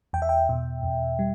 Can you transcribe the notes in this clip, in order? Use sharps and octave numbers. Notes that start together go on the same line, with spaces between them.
E2 G5
E5
G5
B2
E2
G3